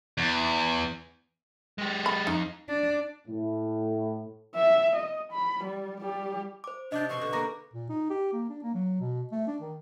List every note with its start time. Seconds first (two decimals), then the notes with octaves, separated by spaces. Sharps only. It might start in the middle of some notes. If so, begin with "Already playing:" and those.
0.18 E2
1.78 G#3 G4
2.06 B5
2.27 F2 D#4
2.69 D4
3.28 A2
4.56 E5
4.96 D#5
5.32 B5
5.64 G3
6.01 G3 G4
6.64 C5 D6
6.92 C3 D4 D#5 D6 G6
7.09 B2 C4 C6 C#6
7.21 D3
7.33 A#3 B3 A#5 D6 A#6
7.74 A#2
7.89 D#4
8.10 G4
8.33 A#3
8.49 D4
8.63 A#3
8.74 F#3
9.00 B2
9.32 A3
9.47 D4
9.61 D#3